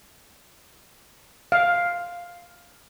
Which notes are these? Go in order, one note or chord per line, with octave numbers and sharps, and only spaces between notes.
F5